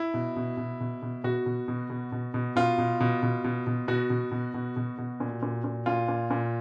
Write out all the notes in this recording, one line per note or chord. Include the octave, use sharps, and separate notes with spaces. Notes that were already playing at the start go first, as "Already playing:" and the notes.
Already playing: E4
B2
B2
B2
B2
B2
B2 F#4
B2
B2
B2
B2
B2
B2 F4
B2
B2
B2
B2
B2
B2 F#4
B2
B2
B2
B2
B2
A#2
A#2
A#2
A#2 F4
A#2
A#2